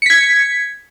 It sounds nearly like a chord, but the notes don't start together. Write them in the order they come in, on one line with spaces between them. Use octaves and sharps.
C#7 B6 G#6